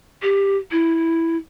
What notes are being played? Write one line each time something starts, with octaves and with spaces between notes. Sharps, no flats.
G4
E4